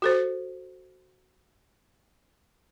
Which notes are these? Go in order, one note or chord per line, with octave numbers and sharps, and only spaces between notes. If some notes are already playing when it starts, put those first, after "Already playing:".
F#4 A4 C5